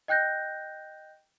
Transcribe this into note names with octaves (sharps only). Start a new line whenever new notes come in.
D#5 G5 F#6 G6 A#6